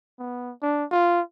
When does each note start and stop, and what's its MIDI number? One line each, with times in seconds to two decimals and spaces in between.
0.19 0.52 59
0.62 0.84 62
0.91 1.21 65